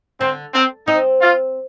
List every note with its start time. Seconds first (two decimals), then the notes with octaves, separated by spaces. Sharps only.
0.20 D3 C4
0.54 C4
0.88 C4 D#4
1.21 F4